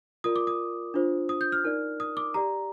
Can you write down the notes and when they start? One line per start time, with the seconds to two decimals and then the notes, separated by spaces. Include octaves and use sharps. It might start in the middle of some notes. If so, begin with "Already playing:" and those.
0.24 F4 A#4 D5 D#6
0.36 D6
0.47 D#6
0.94 D4 F4 C5
1.29 D#6
1.41 G6
1.52 F6
1.64 D#4 A#4 D5
2.00 D#6
2.17 D6
2.34 G4 D5 A#5